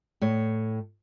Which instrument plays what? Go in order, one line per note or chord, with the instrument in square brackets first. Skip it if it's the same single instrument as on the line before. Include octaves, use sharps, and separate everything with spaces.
[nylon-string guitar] A2 C#5